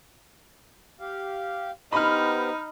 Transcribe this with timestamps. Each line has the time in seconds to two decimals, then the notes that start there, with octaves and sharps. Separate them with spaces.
1.00 G4 F5
1.93 B3 D#4 G4 C5 B5 F6